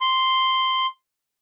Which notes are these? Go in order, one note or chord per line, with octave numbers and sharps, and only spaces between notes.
C6